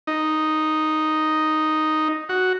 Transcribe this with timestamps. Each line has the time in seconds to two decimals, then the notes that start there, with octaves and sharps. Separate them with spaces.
0.07 D#4
2.29 F#4